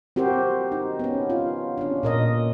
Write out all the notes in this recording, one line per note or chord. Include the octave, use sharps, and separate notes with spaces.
C4 F#4 G4 A#4 C5
D#4
B3 C#4
F4
C#4 D4
A#2 A#4 D#5